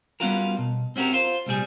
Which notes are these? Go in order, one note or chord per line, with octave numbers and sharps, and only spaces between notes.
G3 B3 C#4 F4 F#4 A#4
B2
C4 C#4 F#4 G4 A#4
F4 C5
C2 A#2 G3 G#4